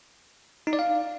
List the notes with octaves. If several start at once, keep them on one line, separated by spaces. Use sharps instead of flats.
D#4
D5
F5